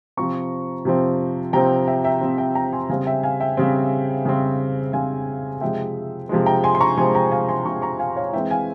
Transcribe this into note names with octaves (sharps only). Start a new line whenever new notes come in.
C3 F3 C4 A#5 C#6
C3 F3 C4
C3 F3 C4 G5 A#5
E5 G5
E5 G5
C3 F3 C4
E5 G5
G5 A#5
G#5 C6
C#3 G3 C4 F5 G#5
E5 G5
F5 G#5
E5 G5
C#3 G3 C4
C#3 G3 C4
C#3 G3 C4 F5 G#5
C3 F3 G#3 E5 G5
C3 F3 G#3
G5 A#5
G#5 C6
C6
A#5 C#6
C3 F3 G#3 G#5 C6
G5 A#5
F5 G#5
G#5 C6
C3 F3 G#3 A#5 C#6
A#5 C#6
F5 G#5
C#5 F5
E3 G#3 C4 E5 G5
F5 G#5